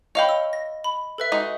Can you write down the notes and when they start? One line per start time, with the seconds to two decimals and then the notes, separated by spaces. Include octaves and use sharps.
0.15 C#5 D#5 F5 G5 B5
0.29 E6
0.53 A#6
0.84 B5
1.18 A4 B4 E5
1.32 G#3 D#4 F#4